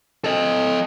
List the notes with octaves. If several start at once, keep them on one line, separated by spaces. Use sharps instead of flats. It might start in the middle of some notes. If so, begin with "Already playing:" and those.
A4 D#5